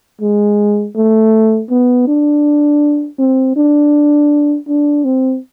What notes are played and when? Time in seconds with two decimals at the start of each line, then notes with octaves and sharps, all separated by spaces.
0.22 G#3
0.96 A3
1.71 B3
2.08 D4
3.19 C4
3.57 D4
4.68 D4
5.05 C4